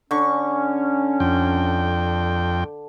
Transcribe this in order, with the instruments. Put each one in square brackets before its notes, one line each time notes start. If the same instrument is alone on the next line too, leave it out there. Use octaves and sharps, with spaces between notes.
[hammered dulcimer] D3 C#6 [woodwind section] C#4
[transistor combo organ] F2 G5